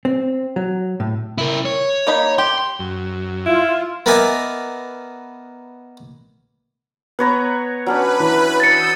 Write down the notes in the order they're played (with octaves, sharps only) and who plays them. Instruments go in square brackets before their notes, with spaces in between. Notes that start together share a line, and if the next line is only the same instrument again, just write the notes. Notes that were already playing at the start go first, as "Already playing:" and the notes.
[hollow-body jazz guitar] C4
F#3
A2
[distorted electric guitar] E4 A#4
C#5
[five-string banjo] A#3 D#4 B5
[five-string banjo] G4 [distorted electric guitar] C6
[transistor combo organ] F#2
[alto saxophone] E4 [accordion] F4
[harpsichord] B3 D#4 A#4 D5 E5 G#5
[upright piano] B3 [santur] B4 C#5 A#5
[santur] F#3 C#4 D4 [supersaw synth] B4 B5
[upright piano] E3
[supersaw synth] D#6 E6 G6 [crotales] A6 C#7